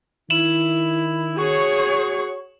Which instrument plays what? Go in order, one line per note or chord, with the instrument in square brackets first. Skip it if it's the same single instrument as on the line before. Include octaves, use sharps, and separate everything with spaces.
[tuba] D#3 [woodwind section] E4 [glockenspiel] E7 F#7
[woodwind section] F#4 C#6 [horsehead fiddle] G#4 C#5